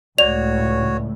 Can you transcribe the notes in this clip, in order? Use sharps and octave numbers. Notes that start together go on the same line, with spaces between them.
C#2 A2 F#4 C#5 D5 F7